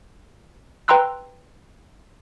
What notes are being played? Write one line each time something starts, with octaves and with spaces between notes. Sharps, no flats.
B4 G5 A#5 C6 E6 F#6